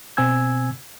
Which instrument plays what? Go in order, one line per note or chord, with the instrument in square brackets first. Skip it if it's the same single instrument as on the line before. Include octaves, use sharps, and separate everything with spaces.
[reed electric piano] B2 C4 G#5 E6 G#6